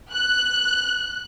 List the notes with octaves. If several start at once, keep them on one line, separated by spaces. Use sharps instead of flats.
F#6